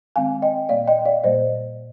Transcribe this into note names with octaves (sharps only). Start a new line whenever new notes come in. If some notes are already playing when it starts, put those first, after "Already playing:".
D#3 G#3 C4 F5 G#5
D#5 G5
A#2 G3 A#3 D5 F5
D#5 G5
D5 F5
A#2 G3 A#3 C5 D#5